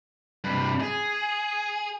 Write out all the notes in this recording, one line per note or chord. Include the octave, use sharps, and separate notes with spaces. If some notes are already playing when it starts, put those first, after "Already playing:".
G2 C3 B5
G#4 G#5